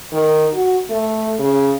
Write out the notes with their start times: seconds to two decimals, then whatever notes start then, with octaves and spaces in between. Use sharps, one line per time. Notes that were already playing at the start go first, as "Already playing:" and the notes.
0.12 D#3
0.54 F#4
0.90 A3
1.39 C#3